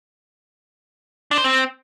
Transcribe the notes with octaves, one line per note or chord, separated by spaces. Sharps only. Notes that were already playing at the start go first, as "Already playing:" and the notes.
D4
C5
C4